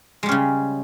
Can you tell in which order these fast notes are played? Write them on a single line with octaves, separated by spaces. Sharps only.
G#3 G3 C#4 C#3